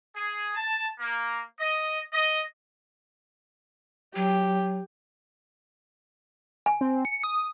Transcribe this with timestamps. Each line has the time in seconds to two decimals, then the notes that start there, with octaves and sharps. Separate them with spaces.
0.15 G#4
0.55 A5
0.98 A#3
1.58 D#5
2.13 D#5
4.16 F#3 G4
6.66 G#5
6.81 C4
7.05 C#7
7.24 D#6